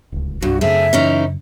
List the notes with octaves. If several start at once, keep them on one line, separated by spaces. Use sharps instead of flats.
D1 C#2
C2 G2 F#4
F#2 C#3 A3 C4 G#4 E5
E3 C#4 D#4